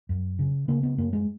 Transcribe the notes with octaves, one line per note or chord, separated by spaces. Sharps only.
F#2
C#3
C#3 A#3
B3
F#2 A#3
G#3